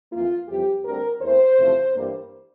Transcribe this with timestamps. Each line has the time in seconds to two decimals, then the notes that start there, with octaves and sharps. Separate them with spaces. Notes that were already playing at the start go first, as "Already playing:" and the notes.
0.11 F2 E3 A#3 F4
0.48 F2 C3 E3 G3 G4
0.85 D2 D3 G3 C4 A#4
1.22 E2 E3 A3 C4 C5
1.58 E2 C3 F3 A3
1.95 G2 E3 G3 A#3